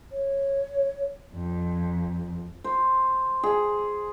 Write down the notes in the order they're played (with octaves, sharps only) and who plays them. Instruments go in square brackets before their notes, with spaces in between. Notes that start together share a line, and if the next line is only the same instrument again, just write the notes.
[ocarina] C#5
[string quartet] F2
[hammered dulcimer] C5
G#4